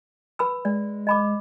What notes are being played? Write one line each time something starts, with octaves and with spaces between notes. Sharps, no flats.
B4 B5 E6
G#3 D5
D#5 B5 D6